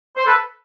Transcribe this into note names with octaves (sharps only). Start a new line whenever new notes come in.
C5
A4 B4